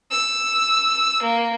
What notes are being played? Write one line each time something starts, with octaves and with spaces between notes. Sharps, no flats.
E6
A#3